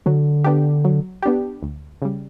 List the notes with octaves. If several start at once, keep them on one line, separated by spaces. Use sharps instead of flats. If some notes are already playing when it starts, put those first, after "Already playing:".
D3 F#3
B3 D4 G4
F#3
B3 D4 G4
D2
C#3 G3